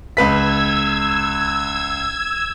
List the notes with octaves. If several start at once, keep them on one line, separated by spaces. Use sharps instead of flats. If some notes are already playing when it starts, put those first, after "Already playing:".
C#2 B4 E6 G#6 B6